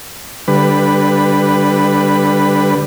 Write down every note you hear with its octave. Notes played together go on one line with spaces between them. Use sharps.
D3 G3 B4